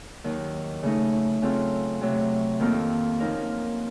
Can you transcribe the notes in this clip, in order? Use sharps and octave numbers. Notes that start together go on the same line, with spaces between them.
D#2 D#3 F#3
C#3 A3 D#4
C#3 F#3 C4 F4 A4
C3 F#3 A3
F2 D#3 A#3 F4 A4
F#2 F3 A#3 D#4 A#4